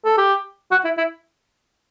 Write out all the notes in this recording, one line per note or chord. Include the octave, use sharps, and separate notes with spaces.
A4
G4
F#4
E4
E4